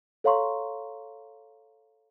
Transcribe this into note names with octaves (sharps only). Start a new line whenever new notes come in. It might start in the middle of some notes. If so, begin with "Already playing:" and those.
A4 C#5 F5 A#5 C6 C#6